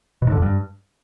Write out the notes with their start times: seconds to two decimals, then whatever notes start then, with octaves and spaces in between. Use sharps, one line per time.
0.22 B2
0.27 G#2
0.32 D3
0.37 F2
0.42 G2